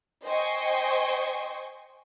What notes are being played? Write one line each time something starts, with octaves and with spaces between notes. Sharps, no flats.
C5 D#5 G5 G#5 C#6